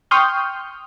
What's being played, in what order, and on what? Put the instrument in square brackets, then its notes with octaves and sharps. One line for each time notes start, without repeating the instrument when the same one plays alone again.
[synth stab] G5 C6 C#6 D#6 F6 G6